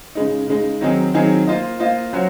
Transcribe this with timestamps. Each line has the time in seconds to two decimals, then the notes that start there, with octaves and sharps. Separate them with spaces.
0.15 C#3 G#3 D#4
0.48 C#3 G#3 D#4
0.81 D#3 F#3 C4 D#4 G#4
1.14 D#3 F#3 C4 D#4 G#4
1.47 A#3 F4 C5 D#5
1.80 A#3 F4 C5 D#5
2.13 F#3 C#4 F#4 C5